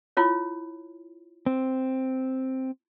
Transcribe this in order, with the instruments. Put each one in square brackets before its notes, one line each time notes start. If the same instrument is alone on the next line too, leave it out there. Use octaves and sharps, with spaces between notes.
[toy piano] E4 F4 C#5
[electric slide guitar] C4